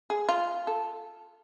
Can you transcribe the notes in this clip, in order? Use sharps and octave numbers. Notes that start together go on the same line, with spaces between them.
G#4
F4
A4